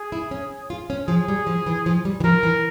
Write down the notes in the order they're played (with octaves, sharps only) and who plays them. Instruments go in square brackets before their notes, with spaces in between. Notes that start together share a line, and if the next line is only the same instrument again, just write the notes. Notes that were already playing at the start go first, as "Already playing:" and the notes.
Already playing: [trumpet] G#4
[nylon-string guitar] E4
C#4
F4
C#4
[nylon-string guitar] F3 [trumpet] G#4
[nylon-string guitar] G3
F3
E3
F3
G3
E3
[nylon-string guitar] F3 [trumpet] A#4
[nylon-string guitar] E3